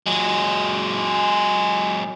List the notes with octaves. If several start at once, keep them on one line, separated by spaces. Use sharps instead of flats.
F#3 G#3